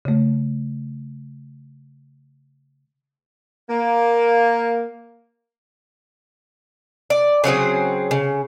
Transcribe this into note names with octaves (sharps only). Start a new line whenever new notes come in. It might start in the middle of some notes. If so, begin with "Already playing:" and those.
C#3 A3
A#3
D5
C#3 F#3 C4 G#4
C#3